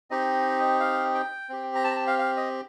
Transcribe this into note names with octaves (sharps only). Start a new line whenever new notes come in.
C4 D#4 G4 D#5
F5
G5
C4 G4
A#5
A5
A#5
A5
F5
F5
D#5